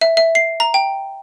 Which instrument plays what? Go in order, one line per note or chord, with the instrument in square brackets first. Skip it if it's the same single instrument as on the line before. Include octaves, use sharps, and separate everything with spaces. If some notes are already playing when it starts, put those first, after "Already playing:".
[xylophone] E5
E5
C7
A#5
G5